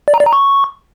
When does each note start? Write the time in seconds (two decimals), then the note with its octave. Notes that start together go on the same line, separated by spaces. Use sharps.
0.08 D5
0.14 A#5
0.20 D5
0.26 A#5
0.33 C#6